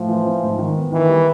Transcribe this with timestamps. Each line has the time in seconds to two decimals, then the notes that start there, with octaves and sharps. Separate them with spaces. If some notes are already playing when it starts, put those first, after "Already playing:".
Already playing: A2 F3
0.09 E3
0.26 C4
0.43 G#2
0.59 D#3
0.75 B3
0.92 D#3 E3
1.09 G3